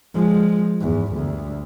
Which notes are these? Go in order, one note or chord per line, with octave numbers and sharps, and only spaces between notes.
F3 G#3
E2 G#2
D2 G2